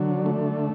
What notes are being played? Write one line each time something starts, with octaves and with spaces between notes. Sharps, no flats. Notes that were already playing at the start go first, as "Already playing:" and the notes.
Already playing: D3 F#3
A3